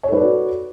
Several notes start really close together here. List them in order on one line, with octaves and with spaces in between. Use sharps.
C#5 A4 B4 D5 F#4